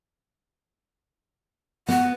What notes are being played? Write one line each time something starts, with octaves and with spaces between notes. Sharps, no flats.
B3 F#5